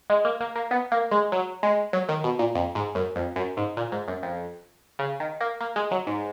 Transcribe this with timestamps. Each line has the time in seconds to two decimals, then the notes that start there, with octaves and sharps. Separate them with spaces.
0.10 G#3
0.25 A#3
0.41 A#3
0.56 A#3
0.71 B3
0.92 A#3
1.11 G#3
1.32 F#3
1.63 G#3
1.93 F#3
2.09 D#3
2.24 B2
2.39 A#2
2.55 F2
2.75 G#2
2.95 F#2
3.16 F2
3.36 F#2
3.57 G#2
3.77 A#2
3.92 G#2
4.08 F#2
4.23 F2
4.99 C#3
5.20 D#3
5.41 A#3
5.61 A#3
5.76 G#3
5.91 F#3
6.07 G#2